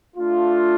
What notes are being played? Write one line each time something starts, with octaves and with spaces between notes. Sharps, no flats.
A3 D4 F4